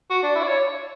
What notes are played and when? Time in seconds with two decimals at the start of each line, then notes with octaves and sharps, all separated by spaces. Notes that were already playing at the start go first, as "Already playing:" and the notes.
0.10 F#4
0.23 D4
0.36 E4
0.43 D5
0.48 C#5